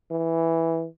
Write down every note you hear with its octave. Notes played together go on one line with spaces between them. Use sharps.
E3